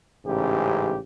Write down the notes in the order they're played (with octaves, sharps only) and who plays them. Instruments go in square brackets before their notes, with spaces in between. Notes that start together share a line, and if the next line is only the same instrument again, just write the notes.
[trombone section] A1 G#2 C#3 G4